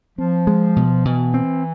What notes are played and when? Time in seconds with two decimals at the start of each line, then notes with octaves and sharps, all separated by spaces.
0.18 F3 C4
0.47 G#3
0.76 B2
1.05 B2 E3
1.34 C4